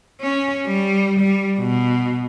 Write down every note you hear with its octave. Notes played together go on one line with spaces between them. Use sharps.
C#4
G3
G3
B2